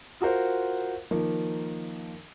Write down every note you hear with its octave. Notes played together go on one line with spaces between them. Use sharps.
F4 F#4 A#4 C5
D#3 F3 A#3